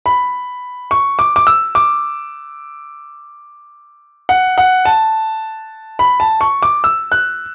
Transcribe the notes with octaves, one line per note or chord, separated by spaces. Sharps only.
B5
C#6
D6
D6
E6
D6
F#5
F#5
A5
B5
A5
C#6
D6
E6
F#6